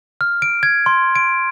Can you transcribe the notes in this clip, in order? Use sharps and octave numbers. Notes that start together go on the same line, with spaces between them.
F6
D7
G#6
C6
D7